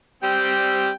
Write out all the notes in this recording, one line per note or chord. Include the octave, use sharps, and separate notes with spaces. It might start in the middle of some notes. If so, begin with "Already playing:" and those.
G3 C4 G5